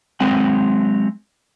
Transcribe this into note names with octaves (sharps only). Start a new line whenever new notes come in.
F#3 G#3 C4 F#5